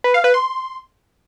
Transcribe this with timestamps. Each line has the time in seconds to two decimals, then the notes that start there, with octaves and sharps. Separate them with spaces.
0.04 B4
0.14 F5
0.24 B4
0.34 C6